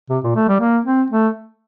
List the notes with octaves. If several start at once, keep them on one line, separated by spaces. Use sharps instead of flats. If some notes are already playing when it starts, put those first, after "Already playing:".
C3
A#2
A3
G3
A#3
C4
A3